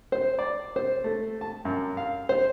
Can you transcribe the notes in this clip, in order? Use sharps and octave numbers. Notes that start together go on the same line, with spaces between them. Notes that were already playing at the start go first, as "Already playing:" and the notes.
C5
D5
C5
A3
A5
F#2
F5
C5